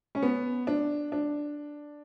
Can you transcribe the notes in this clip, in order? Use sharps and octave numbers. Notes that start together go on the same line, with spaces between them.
C#4
B3
D4
D4